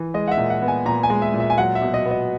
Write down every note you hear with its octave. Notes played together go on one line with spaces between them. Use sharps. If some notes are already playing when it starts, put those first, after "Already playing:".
Already playing: E3
G#3 D#5
F#5
E5
A#2
F#5
B3
G#5
A#2 A#5
G#5
G#3
E5
A#2
E5
G#5
F#3 F#5
E5
B2
D#5
B3
D#5